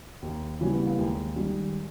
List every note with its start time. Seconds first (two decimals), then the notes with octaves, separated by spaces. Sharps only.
0.22 D#2
0.60 C#3 E3 G3 C#4
0.74 B3
0.86 A#3
0.98 D#2 G#3
1.36 D#3 G3